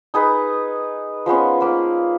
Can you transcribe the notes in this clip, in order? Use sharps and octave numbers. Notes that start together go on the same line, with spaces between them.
D#4 G#4 B4
F3 G#3 B3 C#4
A#3 B4